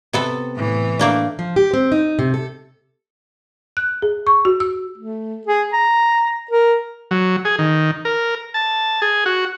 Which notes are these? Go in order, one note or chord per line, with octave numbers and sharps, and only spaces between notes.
C3 B3 A4
A2 E3
A3 A#3 D4
F3
G4
C4
D#4
C3
A4
F#6
G#4
C#6
F#4
E6
A3
G#4
A#5
A#4
F#3
G#4
D#3
A#4
A5
G#4
F#4